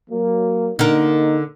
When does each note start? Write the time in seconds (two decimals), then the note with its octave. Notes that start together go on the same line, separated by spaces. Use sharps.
0.10 F#3 A#3
0.79 D3 A#3 D#4 A#4